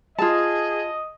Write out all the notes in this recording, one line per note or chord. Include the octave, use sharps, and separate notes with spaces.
F4 G#4 D#5 A5